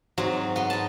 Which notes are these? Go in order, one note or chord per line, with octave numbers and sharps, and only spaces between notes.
G#2 F#3 C4 F#4
B3 F#5 C6
D#4 A5